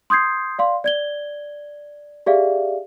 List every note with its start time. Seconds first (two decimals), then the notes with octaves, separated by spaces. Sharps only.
0.10 C6 D#6 G6 G#6 C7
0.59 D5 F5 C6
0.84 D5 G#6 G7
2.26 G4 G#4 D5 E5 F5